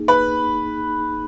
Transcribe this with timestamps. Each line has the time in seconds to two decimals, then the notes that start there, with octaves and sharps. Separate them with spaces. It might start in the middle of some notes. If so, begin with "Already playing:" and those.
Already playing: A#3 D#4 G#4
0.08 B4 B5